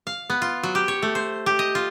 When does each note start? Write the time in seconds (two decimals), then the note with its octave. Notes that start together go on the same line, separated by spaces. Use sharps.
0.07 F5
0.30 B3
0.42 F4
0.63 F#3
0.75 G4
0.88 C#5
1.02 A3
1.15 C5
1.46 G4
1.59 D#5
1.75 F4